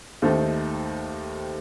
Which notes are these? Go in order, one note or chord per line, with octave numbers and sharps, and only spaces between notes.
D#2 D#3 A3 D#4 A4 C5